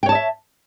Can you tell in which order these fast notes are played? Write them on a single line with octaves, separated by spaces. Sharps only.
G5 C#5 A5 D#5 E5